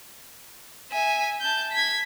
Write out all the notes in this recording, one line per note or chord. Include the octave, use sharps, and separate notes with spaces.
E5 G#5
A5 G6
G#6 B6